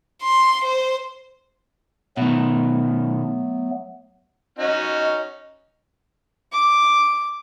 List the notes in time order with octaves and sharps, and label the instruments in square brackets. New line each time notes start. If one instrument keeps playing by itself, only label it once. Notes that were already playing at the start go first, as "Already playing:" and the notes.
[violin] C6
C5
[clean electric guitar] B2 D#3 [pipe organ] F#3 A3 B3
[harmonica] C#4 D#4 F#4 [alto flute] D#5
[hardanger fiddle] D6